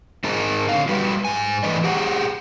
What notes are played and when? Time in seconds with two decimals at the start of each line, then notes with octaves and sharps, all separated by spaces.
0.24 G#2 D#4 G#4 A#4 A5 A#5
0.69 D3 F5
0.89 G3 F#4 B4
1.25 G#2 G#5
1.63 E3 A3 D4 B4 D5 D#5
1.84 G4 G#4 F#5 A#5